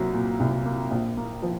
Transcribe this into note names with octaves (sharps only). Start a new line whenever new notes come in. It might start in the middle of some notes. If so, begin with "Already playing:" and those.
Already playing: C2 F#3 A#3
A#2
C2
A#3
A#1
A#3
F3